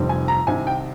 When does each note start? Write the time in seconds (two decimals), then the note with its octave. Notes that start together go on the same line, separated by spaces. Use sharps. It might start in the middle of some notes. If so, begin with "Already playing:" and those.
Already playing: F1 F2 D#3 G3 C4
0.09 G#5
0.28 A#5
0.47 C2 C3 D#3 G#5
0.67 G5